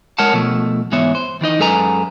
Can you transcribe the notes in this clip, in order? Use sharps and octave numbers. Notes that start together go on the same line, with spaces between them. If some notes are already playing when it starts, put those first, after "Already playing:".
G#3 A#4 C#5 F#5 A5
B2 F3 A3
G#2 E3 B3 C#5 E5
C5
D#3 E3 D#4 D#5
F#2 G#3 A4 B4 G#5 A#5